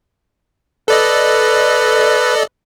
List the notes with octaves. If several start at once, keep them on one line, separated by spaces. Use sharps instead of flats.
A4 B4 D5 D#5